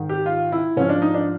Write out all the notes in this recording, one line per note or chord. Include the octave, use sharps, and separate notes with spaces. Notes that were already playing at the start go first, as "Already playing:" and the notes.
Already playing: G#2 D#3
G4
F4
E4
G#2 F3 C#4
D4
D#4
D4